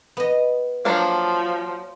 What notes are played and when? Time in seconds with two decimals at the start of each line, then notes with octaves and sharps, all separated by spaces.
0.17 B3 D#5
0.85 F3 F#3 A#3 D4